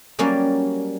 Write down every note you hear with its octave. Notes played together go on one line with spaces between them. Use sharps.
F#3 G3 A#3 C#4 D5